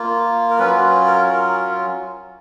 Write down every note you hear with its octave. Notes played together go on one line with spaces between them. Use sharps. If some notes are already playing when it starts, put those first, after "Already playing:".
Already playing: A#3 F4
A#4
F#3 C#4 F4 B4
A#4
A#4